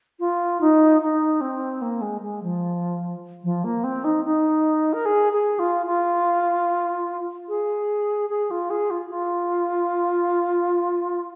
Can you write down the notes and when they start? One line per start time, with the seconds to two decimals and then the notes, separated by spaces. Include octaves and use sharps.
0.20 F4
0.61 D#4
1.01 D#4
1.41 C4
1.82 A#3
2.01 G#3
2.22 G#3
2.43 F3
3.44 F3
3.64 A#3
3.84 C4
4.04 D#4
4.24 D#4
4.93 A#4
5.05 G#4
5.33 G#4
5.59 F4
5.86 F4
7.49 G#4
8.29 G#4
8.51 F4
8.70 G#4
8.90 F4
9.10 F4